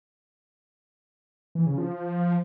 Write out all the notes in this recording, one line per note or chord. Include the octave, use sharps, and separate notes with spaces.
E3
C#3
F3